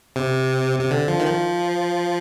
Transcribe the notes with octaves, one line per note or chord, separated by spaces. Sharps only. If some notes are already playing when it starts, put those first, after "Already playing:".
C3
C3
D3
F3
D#3
F3